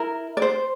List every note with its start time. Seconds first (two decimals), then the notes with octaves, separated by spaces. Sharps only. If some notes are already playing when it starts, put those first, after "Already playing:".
Already playing: E4 A#4
0.37 D5
0.42 C5